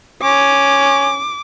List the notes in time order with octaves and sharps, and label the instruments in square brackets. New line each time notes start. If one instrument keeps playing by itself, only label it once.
[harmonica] C#4 [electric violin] D6